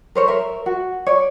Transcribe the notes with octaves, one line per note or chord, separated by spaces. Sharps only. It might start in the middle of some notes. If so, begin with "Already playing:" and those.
A#4 C5 C#5
A#4 E5
F#4
C#5 D5